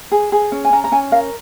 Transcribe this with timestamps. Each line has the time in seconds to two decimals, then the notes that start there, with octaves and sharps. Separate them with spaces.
0.12 G#4
0.32 G#4
0.52 C#4
0.65 G#5
0.73 C#4 A#5
0.84 A#5
0.92 C#4 G#5
1.12 A#4 F5